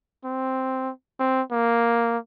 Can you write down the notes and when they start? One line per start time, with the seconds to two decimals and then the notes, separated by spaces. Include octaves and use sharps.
0.25 C4
1.20 C4
1.51 A#3